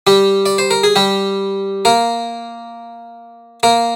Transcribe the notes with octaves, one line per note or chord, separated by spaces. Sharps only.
G3 G4
D5
C5
A#4
G#4
G3 G4
A#3 A#4
A#3 A#4